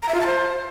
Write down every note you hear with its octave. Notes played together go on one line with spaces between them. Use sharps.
A#5
E5
F4
A5
C5